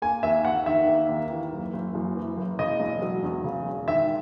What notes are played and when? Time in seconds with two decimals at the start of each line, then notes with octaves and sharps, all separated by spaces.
0.02 A#3 G#5
0.23 D#2 E5
0.45 D#2 F#5
0.66 D#3 E5
0.88 A#3
1.09 D#2
1.30 E3
1.52 F#1
1.73 F#1
1.95 F#2
2.16 E3
2.37 F#1
2.59 C#3 D#5
2.80 E1
3.02 F#3
3.23 E2
3.44 C#3
3.66 E1
3.87 D#3 E5